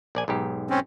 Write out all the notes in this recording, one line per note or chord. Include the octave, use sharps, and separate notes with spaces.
A#1 D5 G#5
B1 G#2 G4
C4 C#4